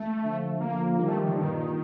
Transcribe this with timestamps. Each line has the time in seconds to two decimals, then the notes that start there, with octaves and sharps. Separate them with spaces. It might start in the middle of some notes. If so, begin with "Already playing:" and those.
Already playing: A3
0.22 D3 F3
0.60 D3 F3 A#3
0.98 D#3 G3 A#3
1.08 A3
1.17 F3
1.27 D3
1.36 G2 A#2 D#3